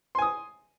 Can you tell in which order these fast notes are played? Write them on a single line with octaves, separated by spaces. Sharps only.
C6 G#5 D#6